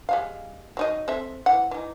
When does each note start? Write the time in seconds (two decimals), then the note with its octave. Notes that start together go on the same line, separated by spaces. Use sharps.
0.09 G3 G#3 F5
0.77 F#3 D#4 D#5
1.08 C4 A4 E5
1.46 E3 F#5
1.71 E3 D#4